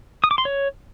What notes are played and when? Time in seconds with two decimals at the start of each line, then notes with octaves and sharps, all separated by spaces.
0.24 D#6
0.31 D6
0.38 C6
0.45 C#5